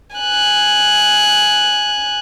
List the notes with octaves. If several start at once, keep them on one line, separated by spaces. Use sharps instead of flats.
G#5 F#6